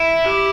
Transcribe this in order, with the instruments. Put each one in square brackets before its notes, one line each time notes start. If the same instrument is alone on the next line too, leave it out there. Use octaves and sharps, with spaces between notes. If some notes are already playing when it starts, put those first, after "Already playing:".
Already playing: [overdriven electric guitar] E4 [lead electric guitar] E5
[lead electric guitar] G4